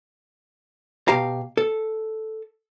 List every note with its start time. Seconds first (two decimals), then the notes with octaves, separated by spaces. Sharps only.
1.08 B2 G4 F5 A#5
1.57 A4